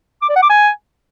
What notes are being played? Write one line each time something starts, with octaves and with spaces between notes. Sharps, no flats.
D6
D5
F#5
D6
G#5